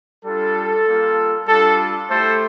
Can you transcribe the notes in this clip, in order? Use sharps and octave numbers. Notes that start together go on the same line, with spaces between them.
G3 D4 F4 A4
G3 A#3 F4
G3 D4 F4 A4
A3 E4 G4 A4 C5